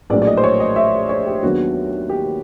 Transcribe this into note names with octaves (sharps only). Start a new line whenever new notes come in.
A#1 A2 F#3 D5
D5
D#5
C5
C#5
D#5
E5
C#5
G4
D#2 D#3 F#3 B3 D4 F#4
G4